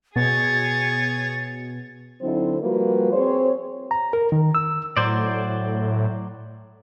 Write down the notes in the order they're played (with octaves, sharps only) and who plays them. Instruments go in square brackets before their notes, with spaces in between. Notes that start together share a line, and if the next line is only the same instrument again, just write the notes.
[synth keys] B2 [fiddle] G#4 C#5 [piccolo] A6
[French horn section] D3 F#3 C4 D#4 E4 C5
F3 G3 A#3 F#4 B4
C4 G#4 C5 C#5
[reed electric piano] A#5
A#4
D#3
E6
[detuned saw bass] A2 [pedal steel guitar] F#3 C5 D5